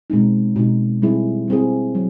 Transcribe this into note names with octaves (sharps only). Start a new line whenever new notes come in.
B2 G#3 C4 D#4
B2 G#3 C4 D#4
G3 C4 E4 G#4
G3 C4 E4 G#4
F#3